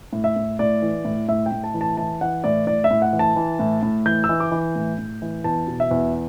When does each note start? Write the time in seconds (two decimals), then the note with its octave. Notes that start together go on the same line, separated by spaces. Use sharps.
0.13 A2
0.24 E5
0.36 A2
0.59 A2 D5
0.82 E3
1.05 A2
1.28 A2 E5
1.46 G5
1.52 A2
1.64 A5
1.74 E3
1.81 A5
1.97 E3 A5
2.21 E3 F#5
2.44 A2 D5
2.67 A2 D5
2.84 E5
2.91 A2
3.02 F#5
3.13 E3
3.19 A5
3.36 E3
3.59 A2
3.83 A2
4.06 E3 G6
4.24 E6
4.29 E3
4.40 D6
4.52 E3
4.76 A2
4.98 A2
5.22 E3
5.44 E2 A5
5.67 B2
5.80 E5
5.91 E2